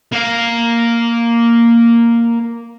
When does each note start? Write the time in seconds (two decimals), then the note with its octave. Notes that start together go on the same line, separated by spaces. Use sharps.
0.13 A#3 F5